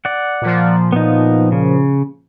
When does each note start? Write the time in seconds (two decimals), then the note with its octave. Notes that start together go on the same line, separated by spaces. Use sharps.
0.05 D5 F#5
0.42 A#2 F3
0.92 B3 D#4
1.52 C#3